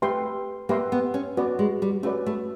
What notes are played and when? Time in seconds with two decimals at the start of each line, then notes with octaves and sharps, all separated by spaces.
0.02 A3 G4 B4 E5 G5 C6
0.69 A#3 G4 B4 E5 G5 C6
0.92 B3
1.14 C#4
1.37 B3 C#4 F#4 B4 D5
1.59 G#3
1.82 G3
2.03 A3 C#4 F#4 B4 D5
2.26 A3